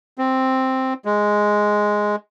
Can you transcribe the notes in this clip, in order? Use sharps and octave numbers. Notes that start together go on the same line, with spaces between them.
C4
G#3